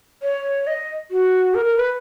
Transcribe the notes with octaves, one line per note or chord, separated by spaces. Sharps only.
C#5
D#5
F#4
A#4
A#4
B4